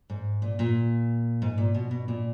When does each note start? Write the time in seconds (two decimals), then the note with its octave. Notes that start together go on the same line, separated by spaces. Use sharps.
0.10 G#2
0.42 A#2
0.59 A#2
1.42 G#2
1.58 A#2
1.74 B2
1.91 B2
2.08 A#2